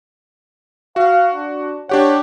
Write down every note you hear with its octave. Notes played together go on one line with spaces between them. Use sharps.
F#4 F5
D4
D4 G4 C#5 F#5